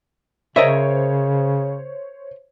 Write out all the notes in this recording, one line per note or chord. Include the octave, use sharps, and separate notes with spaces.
C#3 A#4 C5 C#5 D#5 E5